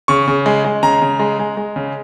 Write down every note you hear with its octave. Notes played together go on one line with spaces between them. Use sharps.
C#3 C#6
C#3
G#3
G#3
C#3 A#5
C#3
G#3
G#3
G#3
C#3